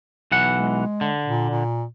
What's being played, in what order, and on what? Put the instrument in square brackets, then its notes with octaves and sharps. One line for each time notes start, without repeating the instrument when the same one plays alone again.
[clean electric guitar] B1 E3 F#5
[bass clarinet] G#3
[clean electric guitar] D3
[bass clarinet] A#2
A#2